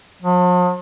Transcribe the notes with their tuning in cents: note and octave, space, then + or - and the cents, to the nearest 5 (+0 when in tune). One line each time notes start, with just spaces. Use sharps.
F3 +45